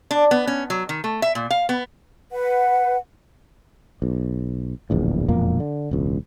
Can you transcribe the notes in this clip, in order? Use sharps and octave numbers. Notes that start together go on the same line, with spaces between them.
D4
B3
C#4
F#3
D#3
A3
E5
A#2
F5
B3
B4 F#5
B1
D1 A#1 E2
E1 F2 A#2 A#3
D3
E1 C#2